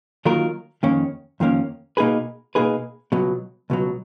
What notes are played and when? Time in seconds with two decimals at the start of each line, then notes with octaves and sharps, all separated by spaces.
0.25 D#3 F#3 A#3 F4 A#4
0.83 F2 D#3 A#3 C#4
1.40 F2 D#3 A#3 C#4
1.97 B2 A#3 D#4 G#4 B4
2.55 B2 A#3 D#4 G#4 B4
3.12 C#2 B2 F#3
3.70 C#2 B2 F#3